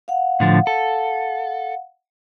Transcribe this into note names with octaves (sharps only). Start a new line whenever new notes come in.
F5 F#5
A2 D3 F3
A4